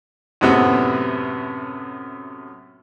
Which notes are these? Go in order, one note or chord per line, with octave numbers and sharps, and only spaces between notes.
F#2 A2 C3 B3